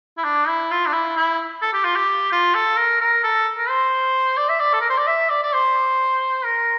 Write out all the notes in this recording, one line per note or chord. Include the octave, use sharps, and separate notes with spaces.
E4
D4
E4
F4
D4
E4
E4
A4
G4
F4
G4
F4
A4
A#4
A#4
A4
A#4
C5
D5
E5
D5
A4
A#4
C5
D5
E5
D5
D5
C5
A#4